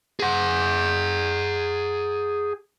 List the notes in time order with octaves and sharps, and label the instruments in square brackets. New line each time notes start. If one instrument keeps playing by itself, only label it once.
[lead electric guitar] G#4 F#5